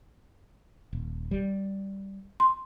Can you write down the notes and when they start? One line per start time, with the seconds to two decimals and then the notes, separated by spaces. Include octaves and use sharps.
0.93 D#1
1.31 G3
2.40 C6